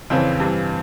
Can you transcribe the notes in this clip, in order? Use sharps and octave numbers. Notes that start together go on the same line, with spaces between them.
F2 C#3 E3 C4
G2 E3